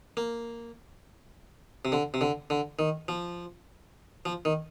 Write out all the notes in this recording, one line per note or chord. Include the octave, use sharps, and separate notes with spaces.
A#3
C3
D3
C3
D3
D3
D#3
F3
F3
D#3